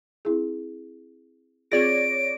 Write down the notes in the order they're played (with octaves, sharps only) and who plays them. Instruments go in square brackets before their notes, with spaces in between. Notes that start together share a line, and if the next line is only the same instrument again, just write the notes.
[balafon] C4 E4 G#4
[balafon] C4 F4 G#4 [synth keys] C#5 D5 A#6 [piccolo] D7